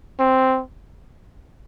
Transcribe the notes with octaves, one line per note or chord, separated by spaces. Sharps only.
C4